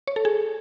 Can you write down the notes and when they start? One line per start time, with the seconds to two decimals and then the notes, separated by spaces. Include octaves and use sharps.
0.07 C#5
0.16 A4
0.25 G#4